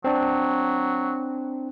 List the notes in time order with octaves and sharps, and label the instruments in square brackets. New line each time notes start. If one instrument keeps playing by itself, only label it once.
[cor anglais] F#3 [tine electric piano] C4 D4